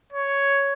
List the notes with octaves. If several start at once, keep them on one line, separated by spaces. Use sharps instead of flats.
C#5